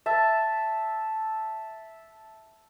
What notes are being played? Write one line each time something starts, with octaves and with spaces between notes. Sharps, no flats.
E5 A5